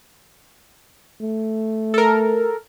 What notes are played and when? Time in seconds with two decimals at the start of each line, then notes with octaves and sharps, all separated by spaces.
1.21 A3
1.94 A4 A#4